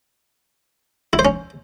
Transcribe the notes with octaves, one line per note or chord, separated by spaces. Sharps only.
E4
C5
C#4